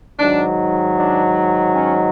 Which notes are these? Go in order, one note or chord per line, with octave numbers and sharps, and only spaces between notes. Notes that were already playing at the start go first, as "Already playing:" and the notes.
G#2 D#3 F#3 D4
D4
C#4